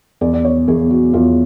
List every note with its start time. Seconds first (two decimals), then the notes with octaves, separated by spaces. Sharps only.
0.21 E2 D5
0.33 D5
0.45 C#5
0.68 E2 G#4
0.90 F#4
1.13 E2 F4